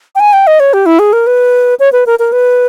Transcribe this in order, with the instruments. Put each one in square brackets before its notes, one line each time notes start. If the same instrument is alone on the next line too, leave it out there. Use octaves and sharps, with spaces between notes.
[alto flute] G5
G#5
G5
D#5
C#5
G4
E4
G#4
A#4
B4
C#5
B4
A#4
A#4
B4